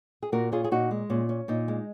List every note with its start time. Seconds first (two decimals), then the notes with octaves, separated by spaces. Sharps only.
0.22 G#4
0.32 A#2 F#4 A#4
0.52 C#4 F4 G#4
0.64 G#4
0.71 A#2 D#4 F#4
0.91 G#3
1.10 A#2 C#4
1.29 C#4
1.48 A#2 D#4
1.68 G#3